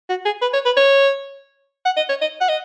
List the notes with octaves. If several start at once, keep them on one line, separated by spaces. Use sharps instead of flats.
F#4
G#4
B4
C#5
B4
C#5
F#5
D#5
C#5
D#5
F#5
D#5